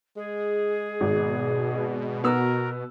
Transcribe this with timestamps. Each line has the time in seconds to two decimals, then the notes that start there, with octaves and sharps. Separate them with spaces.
0.17 G#3 G#4
1.01 G#1 B2
2.24 B3 F#4 A#4 E6